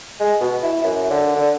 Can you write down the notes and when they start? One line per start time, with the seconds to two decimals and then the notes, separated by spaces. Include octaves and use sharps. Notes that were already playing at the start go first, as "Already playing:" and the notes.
0.20 G#3
0.41 B2
0.63 E4
0.84 F#2
1.10 D3
1.36 D3